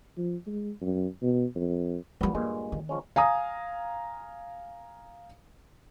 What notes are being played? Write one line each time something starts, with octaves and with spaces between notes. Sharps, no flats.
F3
G#3
F#2
B2
F2
A1 A#2 F3 G3 B3
G2 A#2 G#3 A#3
D#3
F3 G#3 C#4
F5 G#5 A#5 D#6